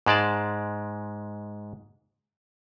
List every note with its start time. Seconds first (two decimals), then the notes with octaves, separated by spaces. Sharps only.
0.06 G#2 G#3 D5 A5